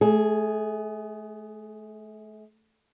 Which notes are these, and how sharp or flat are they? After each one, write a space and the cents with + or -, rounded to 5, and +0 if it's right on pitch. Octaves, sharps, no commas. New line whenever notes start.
A3 -35 G#4 +0